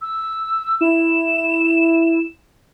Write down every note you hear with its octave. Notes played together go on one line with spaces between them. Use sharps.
E6
E4 E7